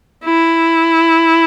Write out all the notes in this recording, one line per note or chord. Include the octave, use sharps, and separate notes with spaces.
E4